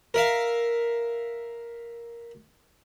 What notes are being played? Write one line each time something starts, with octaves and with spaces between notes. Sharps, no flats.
A#4 E5 F5